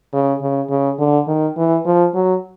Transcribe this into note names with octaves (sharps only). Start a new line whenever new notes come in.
C#3
C#3
C#3
D3
D#3
E3
F3
F#3